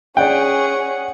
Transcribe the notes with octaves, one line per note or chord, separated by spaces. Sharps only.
C#4 G#4 D5 F#5 G5